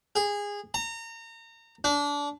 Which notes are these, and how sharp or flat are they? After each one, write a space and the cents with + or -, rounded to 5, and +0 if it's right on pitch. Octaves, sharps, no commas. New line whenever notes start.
G#4 -20
A#5 -30
D4 -25